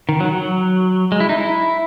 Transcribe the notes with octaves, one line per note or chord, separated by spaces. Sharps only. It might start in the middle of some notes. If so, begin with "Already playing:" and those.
D#3
F#3
F#3
G#3
E4
D#4
E4